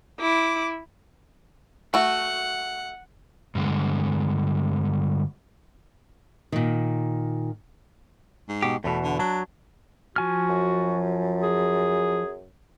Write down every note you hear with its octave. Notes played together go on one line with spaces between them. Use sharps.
E4 D6
A3 F#4 F#5
G2 D3 G#3
A#2 D#3
G#2
B2 G4
E2 B2 A3
D3
F#3 D4
F3 F#4 G#5 F6
F#2
G#4